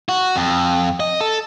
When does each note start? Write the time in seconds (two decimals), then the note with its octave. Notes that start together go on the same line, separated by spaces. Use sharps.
0.09 F#4
0.36 F2
1.00 D#5
1.21 A4